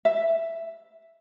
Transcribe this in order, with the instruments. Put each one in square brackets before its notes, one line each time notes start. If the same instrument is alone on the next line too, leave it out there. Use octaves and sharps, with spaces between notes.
[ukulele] E5